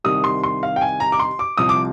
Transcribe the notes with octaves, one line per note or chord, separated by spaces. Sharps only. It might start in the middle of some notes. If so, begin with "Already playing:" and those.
C2 C3 D#3 D#6
C6
C6
F5
G5
G#5
A#5
D6
C6
D6
C2 C3 F3 D#6
D6